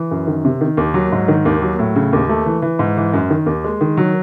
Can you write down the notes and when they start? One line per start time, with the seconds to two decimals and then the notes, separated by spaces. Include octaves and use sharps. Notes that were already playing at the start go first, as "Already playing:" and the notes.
Already playing: E3
0.11 F#2
0.27 D#3
0.45 C3
0.61 D#3
0.77 D#2
0.94 F#3
1.12 G#2
1.28 D#3
1.45 D#2
1.62 F#3
1.79 A2
1.96 C#3
2.13 D#2
2.29 A3
2.46 E3
2.62 E3
2.79 G#2
2.97 E3
3.13 F#2
3.30 D#3
3.46 D#2
3.64 G#3
3.81 D#3
3.97 F#3